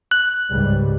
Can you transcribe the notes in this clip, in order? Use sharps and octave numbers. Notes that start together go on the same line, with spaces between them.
F#6
C#2 G#2 G3